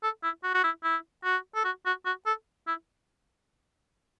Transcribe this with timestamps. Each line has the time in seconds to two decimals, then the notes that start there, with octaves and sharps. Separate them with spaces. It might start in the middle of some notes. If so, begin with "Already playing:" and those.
0.03 A4
0.23 E4
0.44 F#4
0.55 F#4
0.64 E4
0.84 E4
1.24 F#4
1.55 A4
1.65 F#4
1.86 F#4
2.06 F#4
2.26 A4
2.67 E4